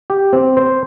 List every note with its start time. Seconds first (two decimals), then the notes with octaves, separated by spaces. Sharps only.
0.10 G4
0.33 C4
0.57 C5